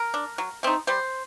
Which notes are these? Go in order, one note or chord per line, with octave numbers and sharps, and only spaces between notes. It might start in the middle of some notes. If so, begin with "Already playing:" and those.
Already playing: A#4
D4
F#3
A3 C4 D#4
G3 C5